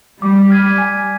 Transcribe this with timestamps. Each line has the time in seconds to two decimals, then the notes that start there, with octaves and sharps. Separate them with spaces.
0.22 G3 D6
0.50 F6 G#6 B6 D#7
0.78 G#5